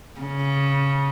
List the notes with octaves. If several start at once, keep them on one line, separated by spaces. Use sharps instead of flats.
C#3